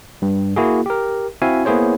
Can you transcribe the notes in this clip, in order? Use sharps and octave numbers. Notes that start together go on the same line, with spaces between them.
G2
A#3 E4 F#4 G#4
G4 A#4
C4 E4 F#4 E5 F5 G#5
A#3 B3 E4 G#4 C5 C#5